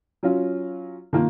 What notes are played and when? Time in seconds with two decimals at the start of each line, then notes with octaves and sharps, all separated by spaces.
0.23 F#3 C#4 F4
1.13 D#3 A#3 F4